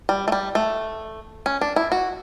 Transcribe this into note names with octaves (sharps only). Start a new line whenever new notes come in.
G3
A3
G3
A3
C#4
D4
E4
F#4